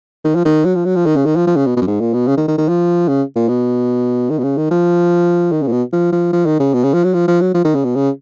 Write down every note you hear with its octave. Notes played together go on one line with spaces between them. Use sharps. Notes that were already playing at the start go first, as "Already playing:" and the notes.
D#3
F3
D#3
F#3
F3
F#3
F3
D#3
C#3
D#3
F3
F3
C#3
B2
B2
F#2
G#2
A#2
B2
C#3
D#3
D#3
D#3
F3
C#3
A#2
B2
D#3
B2
C#3
D#3
F3
D#3
C#3
A#2
B2
F3
F3
F3
D#3
C#3
B2
C#3
F3
F#3
F3
F3
F#3
F3
D#3
C#3
B2
C#3